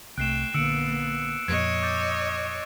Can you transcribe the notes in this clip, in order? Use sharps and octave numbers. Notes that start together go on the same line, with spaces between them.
C2 A3 G5 F#6 C7 E7
A#1 D3 A#3 B3 E6 C#7 D7
F2 A#2 C#5 D#5 G#6
D6 G6 A6